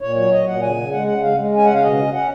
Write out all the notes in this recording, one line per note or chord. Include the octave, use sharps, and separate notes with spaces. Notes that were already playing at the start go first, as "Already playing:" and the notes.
A#2 C#5
F#3 C#5
A#2 D#5
A#2 F#5
C#3 G#5
C#3
G#3 F#5
C#3 F#5
G#3 F5
G#3
C#4 G#5
C#3 F#5
F5
B2 D#5
C#4
C#4 F#5